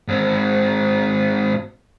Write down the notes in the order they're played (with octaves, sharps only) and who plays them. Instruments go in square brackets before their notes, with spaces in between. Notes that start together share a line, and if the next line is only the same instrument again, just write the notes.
[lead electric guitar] G#2 C4